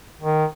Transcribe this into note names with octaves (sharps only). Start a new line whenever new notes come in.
D#3